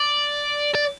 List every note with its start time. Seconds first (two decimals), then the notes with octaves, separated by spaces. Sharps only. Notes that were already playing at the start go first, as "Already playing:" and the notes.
Already playing: D5
0.75 D5